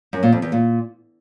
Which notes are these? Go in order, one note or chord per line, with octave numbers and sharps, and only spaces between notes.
F#2
A#2
F2
E2
A#2